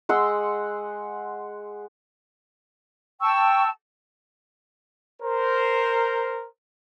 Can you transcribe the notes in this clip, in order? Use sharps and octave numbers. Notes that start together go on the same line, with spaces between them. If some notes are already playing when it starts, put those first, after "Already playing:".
G#3 F#5 C6 E6
G5 A5 C#6 E6
A#4 C5